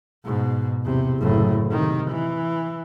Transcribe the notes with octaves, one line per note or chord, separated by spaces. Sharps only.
G#2 B2
E2 C3
F#1 A2
C3 D#3
E3